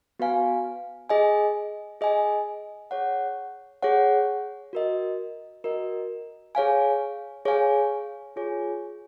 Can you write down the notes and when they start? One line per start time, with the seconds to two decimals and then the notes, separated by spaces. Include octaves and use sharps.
0.20 B3 F#4 B4 F5 G#5
1.09 G#4 D#5 G#5
2.01 G#4 D#5 G#5
2.91 G#4 C#5 F#5
3.82 G#4 C#5 F#5
4.73 F#4 A#4 D#5
5.64 F#4 A#4 D#5
6.55 G#4 C#5 F5 G#5
7.45 G#4 C#5 F5 G#5
8.36 F4 G#4 C#5 G#5